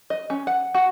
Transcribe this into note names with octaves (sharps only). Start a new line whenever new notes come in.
D#5
C#4
F#5
F#4